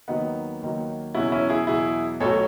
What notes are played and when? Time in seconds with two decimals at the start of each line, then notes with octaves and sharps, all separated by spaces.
0.08 D#2 D#3 F#3 B3 D#4
0.61 D#2 D#3 F#3
1.15 E2 B2 F#3 C#4 E4
1.32 C#4 E4
1.49 E4 G#4
1.67 E2 B2 F#3 E4 G#4
2.20 B1 A2 F#3 A4 C#5